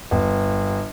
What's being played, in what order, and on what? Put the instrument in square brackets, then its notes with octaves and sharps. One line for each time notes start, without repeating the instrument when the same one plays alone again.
[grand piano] G1